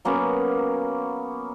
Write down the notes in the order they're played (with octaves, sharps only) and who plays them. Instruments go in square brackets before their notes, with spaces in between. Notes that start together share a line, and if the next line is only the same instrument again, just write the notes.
[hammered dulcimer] F#3 A#3 B3 C#4